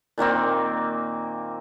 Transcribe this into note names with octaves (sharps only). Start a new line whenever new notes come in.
A#2 D#3 A#3 C4